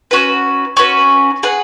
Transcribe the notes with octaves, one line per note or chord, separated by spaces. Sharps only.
C#4 F#4 B4
C#4 F#4 B4
G#4 B4 F#5